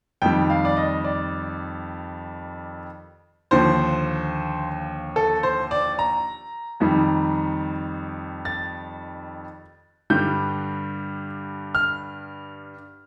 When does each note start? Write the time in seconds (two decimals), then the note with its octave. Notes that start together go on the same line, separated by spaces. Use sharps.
0.22 F2 D#3 G3 G5
0.50 F5
0.65 D5
0.77 D#5
1.04 D5
3.51 D#2 D3 F3 C5
5.16 A4
5.43 C5
5.71 D5
5.99 A#5
6.80 F2 D#3 G3
8.45 A6
10.10 G2 D3 G3 G6
11.75 F6